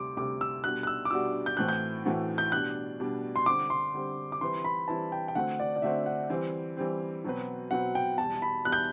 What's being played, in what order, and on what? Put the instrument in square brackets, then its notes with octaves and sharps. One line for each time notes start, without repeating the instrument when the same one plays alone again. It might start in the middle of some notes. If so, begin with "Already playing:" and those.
Already playing: [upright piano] D2 C3 G3 [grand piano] C6 D6
[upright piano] D2 C3 G3 [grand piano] D6
[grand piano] E6
[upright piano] B2 G3 D4 F#4 [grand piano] F#6
[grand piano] F#6
E6
D6
[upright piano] B2 G3 D4 F#4 [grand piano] E6
[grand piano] G6
[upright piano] A2 E3 A3 C4 F#4 [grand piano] F#6
[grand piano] G6
[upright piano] A2 E3 A3 C4 F#4
[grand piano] G6
[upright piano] B2 G3 D4 [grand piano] F#6
[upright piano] B2 G3 D4
[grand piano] C6
[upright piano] D3 G3 C4 [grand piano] D6
[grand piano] C6
[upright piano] D3 G3 C4
[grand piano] D6
[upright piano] E3 G3 C4 E4 B4 [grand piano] C6
[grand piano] B5
[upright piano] E3 G3 C4 E4 B4 [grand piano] A5
[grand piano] G5
G5
[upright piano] D3 A3 C4 F#4 [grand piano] F#5
[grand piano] D5
D5
[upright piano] D3 A3 C4 F#4 [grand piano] E5
[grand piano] F#5
[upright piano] E3 G3 C4
E3 G3 C4
B2 F#3 C4 F#4 B4
[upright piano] B2 F#3 C4 F#4 B4 [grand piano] F#5
[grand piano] G5
[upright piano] E2 B2 G3 [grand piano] A5
[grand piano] B5
[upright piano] E2 B2 G3 [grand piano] F#6
[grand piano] G6